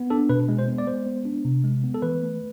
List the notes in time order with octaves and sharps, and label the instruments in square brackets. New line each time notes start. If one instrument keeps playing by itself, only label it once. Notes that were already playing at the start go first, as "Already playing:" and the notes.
Already playing: [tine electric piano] B3
D4 A4
B2 B4
G#3
C5
B3
D5
G#3 C5
B3
D4
C3
G#3
B3
A4
E3 B4
A3